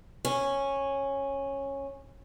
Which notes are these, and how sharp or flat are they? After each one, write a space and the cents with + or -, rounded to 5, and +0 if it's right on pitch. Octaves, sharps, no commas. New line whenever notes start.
C#4 -10